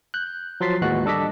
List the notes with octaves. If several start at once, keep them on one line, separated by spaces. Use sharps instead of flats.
F#6 G6
F3 F#3 C6 A6 B6 C7
D#2 A2 E3 G#3 F#4 F#6
G3 D4 A4 D#5 D6 B6